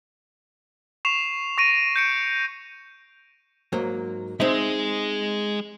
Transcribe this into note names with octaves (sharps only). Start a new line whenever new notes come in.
C#6 C7 E7 F7
C#6 A#6 D7 D#7
G6 C#7 D7
G#2 F#3 A#3
G#3 C4 D#4 G#4 E5